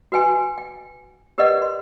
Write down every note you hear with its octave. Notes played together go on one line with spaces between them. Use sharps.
F#4 B4 G5 G#5 C6
G5
G4 A#4 B4 D5 D#5 F#5
C6